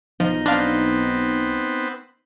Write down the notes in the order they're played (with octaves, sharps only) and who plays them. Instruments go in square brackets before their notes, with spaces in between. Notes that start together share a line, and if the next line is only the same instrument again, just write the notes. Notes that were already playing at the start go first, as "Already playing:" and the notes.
[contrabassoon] B1 [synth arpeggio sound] F3 [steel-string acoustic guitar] D#4
[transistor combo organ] B3 C4 [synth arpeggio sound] D4 F5